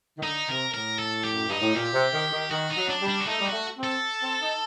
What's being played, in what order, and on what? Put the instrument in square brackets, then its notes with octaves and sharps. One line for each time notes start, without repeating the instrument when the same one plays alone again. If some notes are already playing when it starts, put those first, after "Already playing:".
[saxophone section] D#3
[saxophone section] D3 [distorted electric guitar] D#4
[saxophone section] C3 [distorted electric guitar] A#4
[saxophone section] A2 [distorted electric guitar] A#4
[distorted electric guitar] A4
G4
[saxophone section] F#2
[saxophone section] G2 [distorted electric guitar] D#4
[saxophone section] A2
[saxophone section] A#2 [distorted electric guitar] G4
[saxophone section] C3
D#3
D#3
[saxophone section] D#3 [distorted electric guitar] F#4
[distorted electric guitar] D#4
[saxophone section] F#3
[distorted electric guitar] D4
[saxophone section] G3
[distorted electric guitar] D4
F#4
[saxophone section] A3 [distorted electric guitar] D#4
[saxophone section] G3
[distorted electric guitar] F#4
[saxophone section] A3
C4
[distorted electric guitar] A4
[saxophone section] C4
D#4